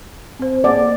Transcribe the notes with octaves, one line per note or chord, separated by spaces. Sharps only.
C4 C5
A#3 G#4 D5 F#5